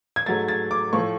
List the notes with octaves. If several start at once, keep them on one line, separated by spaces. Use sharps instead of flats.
G#6
G#2 F#3 A3 A6
A6
D6
A2 F3 A3 C#6